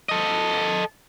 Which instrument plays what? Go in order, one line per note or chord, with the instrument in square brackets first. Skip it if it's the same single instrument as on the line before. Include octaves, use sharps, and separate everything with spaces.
[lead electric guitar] A4 D#5